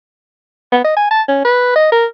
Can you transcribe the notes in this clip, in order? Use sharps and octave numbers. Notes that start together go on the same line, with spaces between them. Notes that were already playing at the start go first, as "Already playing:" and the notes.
B3
D#5
G#5
A5
C#4
B4
D#5
A#4